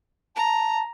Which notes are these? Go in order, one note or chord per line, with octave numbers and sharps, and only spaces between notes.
A5 A#5